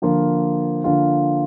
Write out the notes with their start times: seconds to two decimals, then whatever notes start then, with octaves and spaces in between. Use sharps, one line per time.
0.02 D3 F3 A#3 F4
0.84 D3 F3 A#3 F4